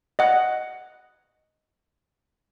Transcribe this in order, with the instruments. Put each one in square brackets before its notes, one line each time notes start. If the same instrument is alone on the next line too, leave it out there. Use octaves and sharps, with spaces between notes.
[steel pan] D#5 F#5